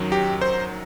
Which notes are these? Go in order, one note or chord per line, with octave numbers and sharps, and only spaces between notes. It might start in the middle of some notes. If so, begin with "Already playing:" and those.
Already playing: F#2 D#3 F#3
G4
C5